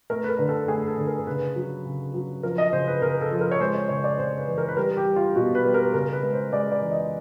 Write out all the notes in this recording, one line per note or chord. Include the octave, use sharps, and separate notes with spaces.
A3 A#4
B4
A#4
D3
A4
A3 G#4
A4
D3
A#4
C#3 B4
F#3
C#3
F#3
F3 A#4
D#5
C#3 C5
B4
C#3 A#4
A4
F3
A#4
C#5
G#3 C5
C#5
C#3 C#5
D5
C#3 C5
B4
E3
A#4
B4
G3 A#4
G4
G3
F4
B2 F#4
B4
G3
A#4
C#3 A#4
B4
G#3
C5
G#3 D5
D5
E3
D#5